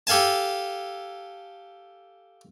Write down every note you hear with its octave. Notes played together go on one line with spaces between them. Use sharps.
G4 A4 F5 G#5 A5